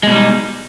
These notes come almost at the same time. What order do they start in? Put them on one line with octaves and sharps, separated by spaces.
G#3 B2 G3 D#4